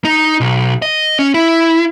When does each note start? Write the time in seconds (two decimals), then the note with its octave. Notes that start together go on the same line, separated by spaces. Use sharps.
0.05 D#4
0.41 B1
0.82 D#5
1.19 C#4
1.34 E4